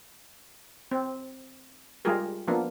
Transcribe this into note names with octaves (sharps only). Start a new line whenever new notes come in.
C4
G3 G#3 F4 G4 G#4 A#4
F3 A#3 B3 D4